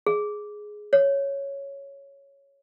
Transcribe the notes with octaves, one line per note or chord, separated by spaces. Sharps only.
G#4
C#5